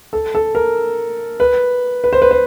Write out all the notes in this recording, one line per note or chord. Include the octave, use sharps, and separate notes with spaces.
A4
A4
A#4
B4
B4
C5
B4
C5